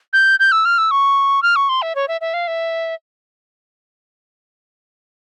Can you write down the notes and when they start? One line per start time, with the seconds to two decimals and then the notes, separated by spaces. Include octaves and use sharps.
0.13 G6
0.40 G6
0.52 E6
0.65 F6
0.78 E6
0.91 C#6
1.43 F6
1.56 C#6
1.69 C6
1.82 E5
1.95 C#5
2.08 E5
2.21 E5
2.34 F5
2.48 E5